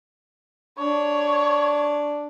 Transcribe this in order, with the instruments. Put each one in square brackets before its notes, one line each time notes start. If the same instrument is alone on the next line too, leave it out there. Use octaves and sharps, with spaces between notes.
[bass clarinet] D4 [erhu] C#5